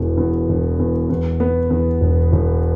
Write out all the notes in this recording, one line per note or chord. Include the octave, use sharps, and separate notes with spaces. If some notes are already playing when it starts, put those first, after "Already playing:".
Already playing: E1 E2 E3
E2
E1
E2
E2
B3
E2
E1
E1